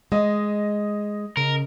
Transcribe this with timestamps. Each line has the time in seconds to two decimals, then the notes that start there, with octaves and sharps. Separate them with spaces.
0.12 G#3 D#5
1.37 C#3 A#4